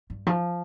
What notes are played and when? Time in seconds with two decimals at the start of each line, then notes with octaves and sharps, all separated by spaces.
0.10 G2
0.27 F3